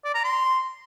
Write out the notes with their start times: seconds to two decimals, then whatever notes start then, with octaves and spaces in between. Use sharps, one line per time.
0.04 D5
0.14 A#5
0.24 C6